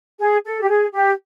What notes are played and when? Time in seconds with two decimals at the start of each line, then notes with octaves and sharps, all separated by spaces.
0.19 G#4
0.44 A4
0.61 G4
0.69 G#4
0.93 G4